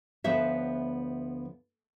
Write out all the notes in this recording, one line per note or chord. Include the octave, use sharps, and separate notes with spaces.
D2 F3 B3 C5 C#5 E5